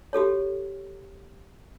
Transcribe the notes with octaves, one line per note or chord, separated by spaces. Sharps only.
F#4 G4 A4 C#5